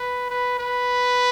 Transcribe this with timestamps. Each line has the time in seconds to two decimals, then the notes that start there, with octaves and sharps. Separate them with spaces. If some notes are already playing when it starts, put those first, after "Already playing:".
Already playing: B4
0.30 B4
0.59 B4